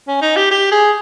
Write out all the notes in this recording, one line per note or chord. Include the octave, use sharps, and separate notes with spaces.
C#4
D#4
G4
G4
G#4